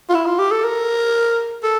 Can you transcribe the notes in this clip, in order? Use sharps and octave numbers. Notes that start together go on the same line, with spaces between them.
F4
E4
F4
G4
A4
A#4
A4